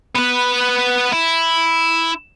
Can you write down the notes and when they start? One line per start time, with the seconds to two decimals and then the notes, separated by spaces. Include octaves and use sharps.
0.16 B3 B4
1.12 E4